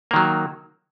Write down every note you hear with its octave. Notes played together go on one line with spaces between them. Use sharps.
D#3 F#3 A#3